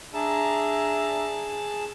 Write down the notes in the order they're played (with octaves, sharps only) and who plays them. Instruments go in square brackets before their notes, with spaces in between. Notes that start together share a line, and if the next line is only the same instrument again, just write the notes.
[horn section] D4 E5 A#5 [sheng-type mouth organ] G#4 A5